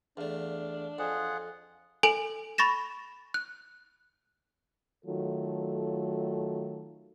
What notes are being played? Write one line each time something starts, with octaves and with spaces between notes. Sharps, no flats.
E2 A3 D4 F5
F2 F4 G#4 F#5
A4 G#5 D7 F#7
B5 C#6 A6 A#6 E7
F#6
D#3 F#3 A3 F4 A4